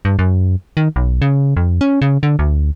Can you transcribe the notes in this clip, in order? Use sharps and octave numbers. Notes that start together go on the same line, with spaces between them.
G2
F#2
D#3
B1
C#3
F2
C#4
C#3
D3
D2